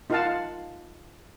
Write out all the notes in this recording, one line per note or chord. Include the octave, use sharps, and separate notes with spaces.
D#4 F4 A#4 F5 F#5 A5